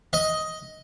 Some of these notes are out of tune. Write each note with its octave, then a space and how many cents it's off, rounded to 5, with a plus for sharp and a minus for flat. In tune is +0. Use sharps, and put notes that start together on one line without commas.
D#5 +10